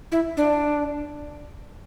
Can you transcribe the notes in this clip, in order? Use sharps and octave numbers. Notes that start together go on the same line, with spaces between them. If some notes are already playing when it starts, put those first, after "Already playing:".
E4
D4